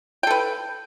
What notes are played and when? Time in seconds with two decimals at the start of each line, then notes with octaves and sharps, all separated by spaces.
0.23 G5
0.27 A4
0.31 B4